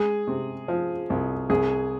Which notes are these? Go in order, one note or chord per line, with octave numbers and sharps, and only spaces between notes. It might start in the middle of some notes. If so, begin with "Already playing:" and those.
Already playing: G#3 G#4
C3
F3
C2
C2 G#4